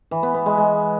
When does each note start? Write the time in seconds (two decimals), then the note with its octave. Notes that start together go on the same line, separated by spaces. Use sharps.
0.11 E3
0.23 B3
0.34 B3
0.46 G#3
0.57 G#3